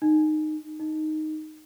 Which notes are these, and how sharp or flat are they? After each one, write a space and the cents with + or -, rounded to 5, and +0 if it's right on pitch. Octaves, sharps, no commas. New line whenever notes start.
D#4 -15
D#4 +0